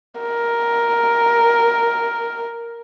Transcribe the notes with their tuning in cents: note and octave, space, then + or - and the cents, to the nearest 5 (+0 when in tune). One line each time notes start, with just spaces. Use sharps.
A#4 +5